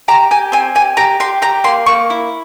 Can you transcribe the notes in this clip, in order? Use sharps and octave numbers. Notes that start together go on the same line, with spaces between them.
G4 A#5
G4 G#5
C4 G#5
G4 G#5
G4 A#5
G4 C6
G4 A#5
A#3 C6
A#3 C#6
E4